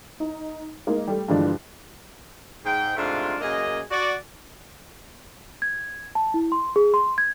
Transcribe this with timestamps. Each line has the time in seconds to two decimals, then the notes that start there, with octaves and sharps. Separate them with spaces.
0.20 D#4
0.87 G#3 A#3 D#4
1.07 G3 A3
1.28 G2 D3 E3 F3 G#3 D4
2.65 G#2 G5
2.96 G#2 C3 A3 D4 F4
3.40 F#2 C#3 A#3 G#4 D#5
3.91 F#4 D5
5.62 G#6
6.15 A5
6.34 E4
6.52 C6
6.76 G#4
6.94 C6
7.18 G#6